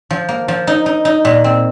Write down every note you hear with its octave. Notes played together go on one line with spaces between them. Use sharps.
F3
A#3
F3
D#4
D#4
D#4
A#2
C4